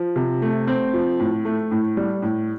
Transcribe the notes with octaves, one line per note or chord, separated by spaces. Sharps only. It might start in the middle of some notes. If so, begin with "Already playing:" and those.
Already playing: F3
C3
A3
C4
F3
A2
A3
A2
G3
A2